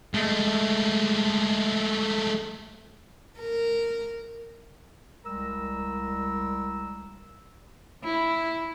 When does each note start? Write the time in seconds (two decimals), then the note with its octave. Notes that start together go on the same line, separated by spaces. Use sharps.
0.14 G#3 A3
3.40 A#4
5.25 C2 G3 G#3 A#4 A#5 E6
8.04 E4